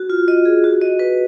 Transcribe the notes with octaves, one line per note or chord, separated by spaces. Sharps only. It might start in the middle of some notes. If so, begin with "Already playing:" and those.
Already playing: F#4
F4
D#5
G#4
F#4
D#5
B4